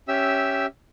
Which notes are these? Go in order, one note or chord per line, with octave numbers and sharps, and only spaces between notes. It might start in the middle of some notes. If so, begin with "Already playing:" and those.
C#4 G4 E5 E6